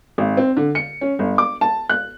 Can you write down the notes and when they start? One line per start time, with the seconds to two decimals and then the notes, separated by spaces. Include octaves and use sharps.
0.18 G#1
0.37 C4
0.57 D3
0.75 C#7
1.01 C#4
1.19 G1
1.38 D6
1.61 A5
1.89 F#6